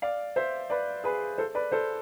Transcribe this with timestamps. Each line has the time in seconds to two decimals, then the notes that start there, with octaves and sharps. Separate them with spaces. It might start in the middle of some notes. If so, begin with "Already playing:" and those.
0.02 D5 F5
0.36 C5 E5
0.70 B4 D5
1.04 G#4 B4
1.38 A4 C5
1.55 B4 D5
1.72 A4 C5